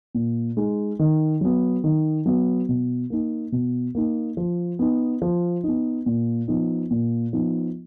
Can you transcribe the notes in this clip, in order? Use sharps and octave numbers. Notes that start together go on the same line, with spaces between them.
A#2
G#3 D#4
D#3
F#3 B3
D#3
F#3 B3
B2
A#3 D#4
B2
A#3 D#4
F3
B3 D#4
F3
B3 D#4
A#2
F3 B3 D#4
A#2
F3 B3 D#4